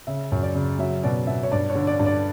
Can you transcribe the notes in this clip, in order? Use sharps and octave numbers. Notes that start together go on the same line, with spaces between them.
C#3 E5
F#2
D5
C#3
F#3 E5
B2 D5
B2 E5
C#5
G2 D5
C#5
D3
D5
G2
D5